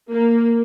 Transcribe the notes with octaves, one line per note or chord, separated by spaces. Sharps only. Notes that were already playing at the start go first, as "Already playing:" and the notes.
A#3